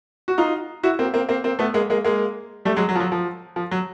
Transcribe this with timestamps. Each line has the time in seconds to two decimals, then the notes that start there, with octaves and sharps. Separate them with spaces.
0.28 F#4
0.38 D#4 F4
0.83 E4 F#4
0.99 A#3 C4
1.14 A#3 C4
1.29 A#3 C4
1.44 A#3 C4
1.59 A3 B3
1.74 G#3 A#3
1.90 G#3 A#3
2.05 G#3 A#3
2.65 G3 A3
2.76 F#3 G#3
2.89 F#3
2.95 F3
3.00 F#3
3.12 F3
3.56 F3
3.71 F#3